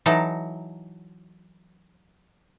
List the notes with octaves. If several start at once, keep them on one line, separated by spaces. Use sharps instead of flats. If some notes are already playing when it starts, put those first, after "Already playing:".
E3 F#3 D#4 A4 A5 A#5